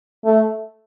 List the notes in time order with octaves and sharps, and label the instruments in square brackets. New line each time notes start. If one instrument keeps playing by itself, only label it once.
[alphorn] A3